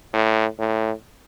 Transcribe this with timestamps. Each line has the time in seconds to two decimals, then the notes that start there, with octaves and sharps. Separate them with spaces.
0.14 A2
0.59 A2